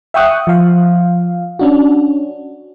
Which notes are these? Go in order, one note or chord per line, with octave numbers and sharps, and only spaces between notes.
E5 F#5 G5 C#6 D#6 F#6
F3 F5
C#4 D4 F#4